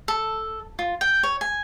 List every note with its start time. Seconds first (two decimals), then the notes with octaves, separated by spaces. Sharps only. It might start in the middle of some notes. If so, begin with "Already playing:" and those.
0.08 A4
0.79 F4
1.01 G5
1.23 C#5
1.41 G#5